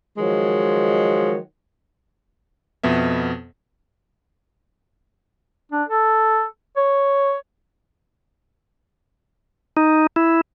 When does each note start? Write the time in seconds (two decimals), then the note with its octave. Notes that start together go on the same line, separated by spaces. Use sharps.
0.17 D#3 F3 F#3 G#3
2.83 F2 B2 B3 E5
5.72 D4
5.89 A4
6.77 C#5
9.77 D#4
10.16 E4